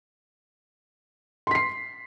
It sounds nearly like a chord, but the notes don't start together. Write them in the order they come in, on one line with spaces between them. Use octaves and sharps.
C6 B6 C7